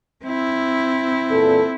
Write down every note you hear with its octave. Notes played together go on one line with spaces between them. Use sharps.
C4 E4
E2 A#2 A4